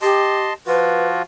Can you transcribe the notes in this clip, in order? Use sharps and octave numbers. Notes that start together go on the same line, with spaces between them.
G4 D#5 A5 C6
F3 F4 F#4 B4